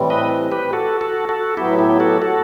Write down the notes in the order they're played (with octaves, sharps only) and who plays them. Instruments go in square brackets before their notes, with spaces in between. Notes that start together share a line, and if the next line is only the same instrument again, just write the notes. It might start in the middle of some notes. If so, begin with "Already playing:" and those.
Already playing: [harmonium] A2 E3 G3 C4
[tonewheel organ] B4 D#5
G4 B4
F#4 A4
F#4 A4
F#4 A4
[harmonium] A2 F#3 B3 [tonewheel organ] E4 G4
[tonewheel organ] E4 G4
F#4 A4
F#4 A4